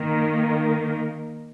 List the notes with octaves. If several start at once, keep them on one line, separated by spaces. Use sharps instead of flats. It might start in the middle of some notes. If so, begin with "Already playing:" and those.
Already playing: D#3 A#3 D#4 A#4